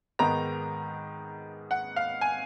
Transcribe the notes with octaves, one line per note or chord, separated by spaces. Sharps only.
G#2 D#3 G#3 B3 A#5
F#5
F5
G#5